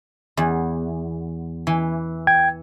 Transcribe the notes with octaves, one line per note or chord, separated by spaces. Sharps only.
E2
E3
G5 G#6